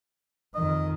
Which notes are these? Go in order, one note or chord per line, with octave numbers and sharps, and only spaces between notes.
F2 D#3 D#5